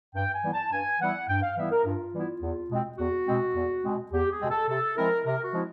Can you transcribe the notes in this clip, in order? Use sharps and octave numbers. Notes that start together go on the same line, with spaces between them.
G2 G5
G#5
E3 G3 B3 E4
A5
G2 G#5
E3 G3 B3 E4 F#5
G2 G5
F5
E3 G3 B3 E4 E5
A#4
G2 F4
E3 G3 B3 E4
E2
B2 G#3 C4
E2 F#4
B2 G#3 C4
E2
B2 G#3 C4
E2 G4
G#4
B2 G#3 C4
A4
C3 A4
F3 G#3 C4 E4 A#4
C3 A#4
F#4
F3 G#3 C4 E4